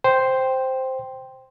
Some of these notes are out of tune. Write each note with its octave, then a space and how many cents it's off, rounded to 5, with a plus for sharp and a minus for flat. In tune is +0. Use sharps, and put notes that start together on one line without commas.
C5 +0 G5 +0